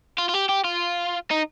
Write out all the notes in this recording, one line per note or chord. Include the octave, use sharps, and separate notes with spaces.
F4
F4
G4
G4
F4
D#4